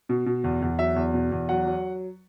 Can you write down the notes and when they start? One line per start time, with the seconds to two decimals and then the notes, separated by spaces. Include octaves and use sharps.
0.09 B2
0.26 B2
0.44 E2
0.62 E2
0.79 F#3 E5
0.96 E2
1.14 B2
1.32 E2
1.49 F#3 F#5
1.66 F#3